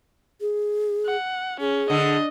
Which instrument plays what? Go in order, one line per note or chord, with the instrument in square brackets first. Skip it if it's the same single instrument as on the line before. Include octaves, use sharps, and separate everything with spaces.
[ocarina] G#4
[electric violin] F#5
[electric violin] C#4 [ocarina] G#4
[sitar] D3 [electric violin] D#5